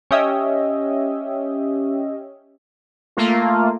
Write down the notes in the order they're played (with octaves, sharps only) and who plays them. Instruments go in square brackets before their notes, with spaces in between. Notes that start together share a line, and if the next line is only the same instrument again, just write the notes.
[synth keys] C#4 G4 D#5 E5
[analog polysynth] A3 A#3 F4